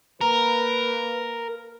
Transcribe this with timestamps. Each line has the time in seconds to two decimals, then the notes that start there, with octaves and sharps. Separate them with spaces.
0.21 A#3 A#4 B4